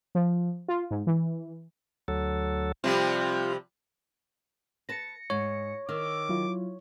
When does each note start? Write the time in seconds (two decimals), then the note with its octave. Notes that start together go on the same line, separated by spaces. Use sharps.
0.15 F3
0.68 F4
0.91 G#2
1.07 E3
2.08 D2 F#3 A4
2.84 C3 F3 G3 F4
4.89 B4 A5 A#6 C#7
5.30 G#2 C#5
5.89 D#3 D6 E6 F6
6.29 F#3 E4 F4